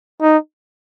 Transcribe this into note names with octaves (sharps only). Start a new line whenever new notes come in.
D#4